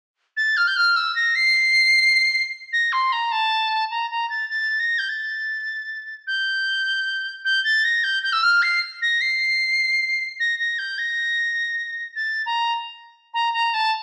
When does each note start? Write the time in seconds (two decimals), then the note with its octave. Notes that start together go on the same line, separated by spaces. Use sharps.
0.37 A6
0.57 F6
0.67 G6
0.77 F6
0.96 E6
1.15 A#6
1.35 C7
2.73 A#6
2.92 C6
3.12 A#5
3.32 A5
3.91 A#5
4.10 A#5
4.30 A6
4.49 A6
4.80 A#6
4.99 G6
5.09 A6
6.27 G6
7.45 G6
7.64 A6
7.84 A#6
8.04 G6
8.23 G6
8.33 E6
8.43 F6
8.62 C7
9.02 A#6
9.21 C7
10.40 A#6
10.59 A#6
10.78 G6
10.98 A#6
12.16 A6
12.46 A#5
13.34 A#5
13.53 A#5
13.74 A5